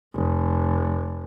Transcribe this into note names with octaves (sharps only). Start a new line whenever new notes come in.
F1